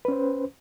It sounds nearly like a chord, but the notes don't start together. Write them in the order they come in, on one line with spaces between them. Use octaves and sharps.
B4 C#4 C5